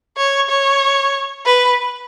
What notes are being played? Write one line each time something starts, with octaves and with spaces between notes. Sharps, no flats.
C#5
C#5
B4